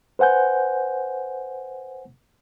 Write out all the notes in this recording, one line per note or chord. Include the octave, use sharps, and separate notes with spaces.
B4 C5 F#5 G#5 G6